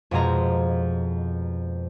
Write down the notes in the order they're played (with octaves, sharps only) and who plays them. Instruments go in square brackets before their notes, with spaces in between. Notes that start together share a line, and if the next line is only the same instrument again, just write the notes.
[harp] F2 B2 G#3 C4 G#4 A#5